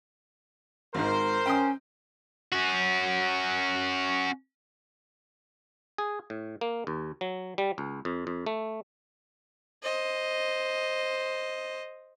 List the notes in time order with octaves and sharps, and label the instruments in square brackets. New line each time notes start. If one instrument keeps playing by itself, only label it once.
[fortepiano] G#1 G#2 [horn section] A#4 C5
[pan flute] C#4 [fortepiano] G5 C6 D#6
[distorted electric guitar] C#4 F#4
[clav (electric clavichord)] G#4
A2
A#3
D#2
F#3
G3
C#2
F2
F2
A3
[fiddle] C5 D#5